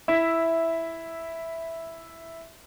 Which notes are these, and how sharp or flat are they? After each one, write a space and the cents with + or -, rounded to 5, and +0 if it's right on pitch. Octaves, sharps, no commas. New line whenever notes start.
E4 +0 E5 -5